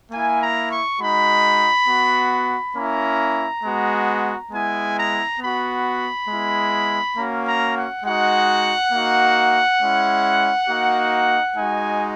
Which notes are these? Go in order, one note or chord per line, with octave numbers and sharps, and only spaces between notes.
A#3 E4 G#5
A#5
C#6
G#3 D#4 F#4 B5
B3 F#4
A#3 C#4 E4 A#5
G#3 B3 F#4
G#3 B3 E4 G#5
A#5
B3 F#4 B5
G#3 B3 E4
A#3 C#4 F#4 A#5
A#5
F#5
G#3 D#4 F#4 F#5
A#3 D#4 F#4
G#3 C#4 E4
A#3 D#4 F#4
G#3 D#4 F#4 G#5